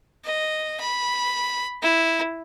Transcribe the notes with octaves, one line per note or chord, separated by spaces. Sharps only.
D#5
B5
E4